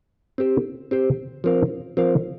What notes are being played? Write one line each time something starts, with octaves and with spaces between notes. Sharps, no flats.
C4 G4 C5
C4 G4 C5
F3 C4 A#4 F5
F3 C4 A#4 F5